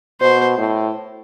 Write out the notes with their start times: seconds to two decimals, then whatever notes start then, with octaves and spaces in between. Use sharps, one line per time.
0.21 B2 C5
0.58 A2